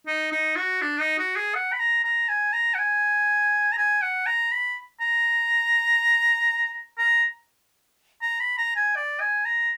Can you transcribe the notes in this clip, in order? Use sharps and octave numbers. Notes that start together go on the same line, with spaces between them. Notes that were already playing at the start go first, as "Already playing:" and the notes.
D#4
D#4
F#4
D4
D#4
F#4
G#4
F#5
B5
A#5
A#5
G#5
A#5
F#5
G#5
A#5
G#5
F#5
A#5
B5
A#5
A#5
A#5
B5
A#5
G#5
D5
G#5
A#5